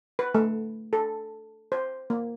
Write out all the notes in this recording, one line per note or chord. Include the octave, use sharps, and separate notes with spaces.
B4
A3
A4
C5
A#3